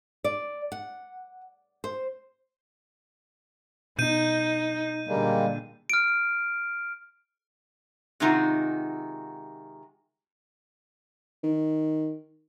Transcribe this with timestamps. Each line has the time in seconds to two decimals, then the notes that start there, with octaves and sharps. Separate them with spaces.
0.24 D5
0.72 F#5
1.84 C5
3.99 B2 D#4 G6 D#7
5.08 A#2 D3 G3 G#3 A#3
5.90 F6 D7
8.20 C3 D#3 G#3 D#4 F4 F#4
11.43 D#3